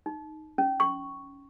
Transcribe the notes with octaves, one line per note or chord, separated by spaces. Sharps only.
D#4
C#4
C#6